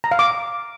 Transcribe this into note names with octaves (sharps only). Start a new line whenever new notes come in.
A#5
F5
D6